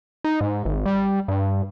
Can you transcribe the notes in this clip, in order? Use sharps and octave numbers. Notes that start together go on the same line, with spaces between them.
D#4
G#2
G#1
G3
G2